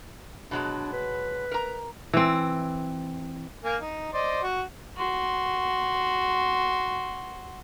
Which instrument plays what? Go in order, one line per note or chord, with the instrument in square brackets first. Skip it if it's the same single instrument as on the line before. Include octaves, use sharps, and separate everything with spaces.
[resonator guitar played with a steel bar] B2 F#3 G#3 [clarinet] D4
[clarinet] B4
[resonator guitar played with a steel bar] A#4 A#5
[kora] E3 C4
[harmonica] A#3 G#5
D#4
C5 D5 D#5
F#4 F#5
[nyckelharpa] F#4 C6